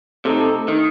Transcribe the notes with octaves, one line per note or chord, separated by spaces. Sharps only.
C3 A3 D#4 A4
D#3